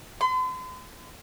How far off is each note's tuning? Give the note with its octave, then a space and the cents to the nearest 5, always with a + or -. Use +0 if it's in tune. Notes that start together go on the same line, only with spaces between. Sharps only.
C6 -45